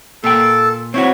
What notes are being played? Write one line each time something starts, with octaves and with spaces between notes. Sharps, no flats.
A#2 A4 G5
C4 E4 F#4 C#5